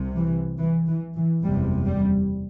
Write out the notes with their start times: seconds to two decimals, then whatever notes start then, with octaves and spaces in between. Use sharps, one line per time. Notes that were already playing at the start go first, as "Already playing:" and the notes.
Already playing: C2 C3
0.17 E3
0.59 E3
0.87 E3
1.15 E3
1.43 F#1 E2 C3 G3
1.85 G3